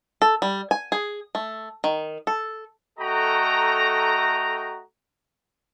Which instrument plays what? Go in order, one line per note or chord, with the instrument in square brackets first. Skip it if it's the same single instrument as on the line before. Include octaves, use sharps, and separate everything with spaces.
[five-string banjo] A4
G3
G#5
G#4
A3
D#3
A4
[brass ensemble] A3 F#4 A4 D#5 G5 A#5